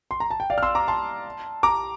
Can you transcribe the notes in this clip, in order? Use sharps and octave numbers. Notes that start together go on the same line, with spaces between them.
C6
A#5
A5
G5
D5 F5
F6
C6 E6
A#5 D6
A5 C6
A#5 D6